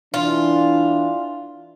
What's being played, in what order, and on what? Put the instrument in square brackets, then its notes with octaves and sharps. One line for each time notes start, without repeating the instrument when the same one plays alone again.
[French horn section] E3 D4 [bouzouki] F4